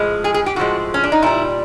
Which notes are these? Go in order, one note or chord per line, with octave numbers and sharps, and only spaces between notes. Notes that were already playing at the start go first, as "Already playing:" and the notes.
Already playing: A2 F3 G#3
G#4
G#4
G4
A2 F3 G#3 F#4
C#4
D4
D#4
A#2 G3 E4